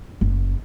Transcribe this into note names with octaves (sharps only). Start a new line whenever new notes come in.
F#1